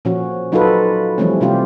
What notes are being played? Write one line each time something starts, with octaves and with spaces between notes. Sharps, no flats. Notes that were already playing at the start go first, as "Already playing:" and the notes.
A#2 F3 C#4 F#4
F#3 D#4 F4 F#4 A4 B4
E3 F3 G3 A3 C4 C#4
C3 F3 C#4 F4 G4